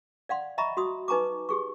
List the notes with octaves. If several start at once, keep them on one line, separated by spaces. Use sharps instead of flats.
D5 F5 F#5 C6
D#5 E5 A#5 B5 C#6
F#4 C6 D#6
D#4 B4 G#5 A#5 C#6 D6
G4 G#4 C#6